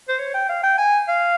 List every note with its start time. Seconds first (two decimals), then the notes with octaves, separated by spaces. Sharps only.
0.09 C5
0.19 C#5
0.34 G5
0.49 F5
0.63 G5
0.78 G#5
1.08 F5